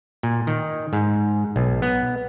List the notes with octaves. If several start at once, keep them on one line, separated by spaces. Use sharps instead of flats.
A#2
D#3
G#2
B1
B3